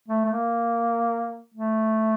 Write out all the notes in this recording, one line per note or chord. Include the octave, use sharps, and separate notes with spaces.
A3
A3
A#3
A3